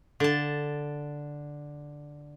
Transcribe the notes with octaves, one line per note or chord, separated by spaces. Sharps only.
D3 A5